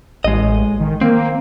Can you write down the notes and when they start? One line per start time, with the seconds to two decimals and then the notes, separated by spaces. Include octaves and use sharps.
0.24 A1 G#3 D#5
0.80 D#3
1.01 A#3 C4